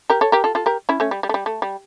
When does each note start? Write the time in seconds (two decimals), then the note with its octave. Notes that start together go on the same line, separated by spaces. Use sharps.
0.10 G4 A#4
0.21 A4 C#5
0.32 G4 A#4
0.44 F4 A4
0.55 F4 A4
0.66 G4 A#4
0.89 C#4 E4
1.00 A3 C#4
1.11 G3
1.23 G3
1.29 A3
1.34 G3
1.46 A3
1.62 G3